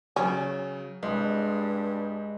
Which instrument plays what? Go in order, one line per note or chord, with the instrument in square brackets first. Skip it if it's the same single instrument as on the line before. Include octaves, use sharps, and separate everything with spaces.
[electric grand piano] C#3 F#3 [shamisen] C#4
[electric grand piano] C2 [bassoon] G2 [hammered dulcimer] G#3